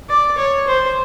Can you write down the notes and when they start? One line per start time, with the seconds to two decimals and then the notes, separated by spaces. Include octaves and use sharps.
0.09 D5
0.38 C#5
0.67 C5